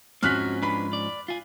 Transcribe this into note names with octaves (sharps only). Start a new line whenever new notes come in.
G#2 F3 C4 C#4 F#4 F6 F#6 B6
D4 B4 B5
D5
F4 G#5